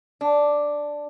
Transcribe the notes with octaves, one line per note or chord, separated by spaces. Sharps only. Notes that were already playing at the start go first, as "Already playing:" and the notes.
D4